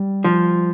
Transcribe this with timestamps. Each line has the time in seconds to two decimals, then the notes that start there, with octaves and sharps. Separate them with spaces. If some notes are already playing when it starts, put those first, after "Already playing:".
Already playing: G3
0.24 F3